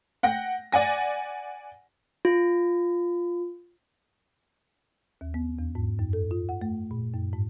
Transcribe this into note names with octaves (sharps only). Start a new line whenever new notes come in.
F#5 G5 A#6
D5 F#5 G#5 A#6
F4
D#2
B3
E2
G#2
F#2
A4
F4
F#5
A3
A#2
F#2
G#2